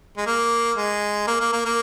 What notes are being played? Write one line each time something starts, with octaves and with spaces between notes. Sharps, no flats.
G#3
A#3
G#3
A#3
A#3
A#3
A#3